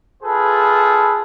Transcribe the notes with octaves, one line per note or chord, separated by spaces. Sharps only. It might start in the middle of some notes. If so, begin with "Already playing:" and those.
F4 G#4 A4 B4